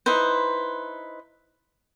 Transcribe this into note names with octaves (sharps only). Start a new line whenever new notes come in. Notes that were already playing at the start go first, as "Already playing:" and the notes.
D#4 E4 B4 C5